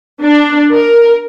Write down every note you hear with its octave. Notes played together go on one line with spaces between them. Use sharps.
D4
A#4